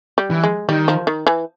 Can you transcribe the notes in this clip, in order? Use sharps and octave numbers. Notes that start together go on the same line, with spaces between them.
G3
E3
G#3
D#3 G3
F3
D#3
E3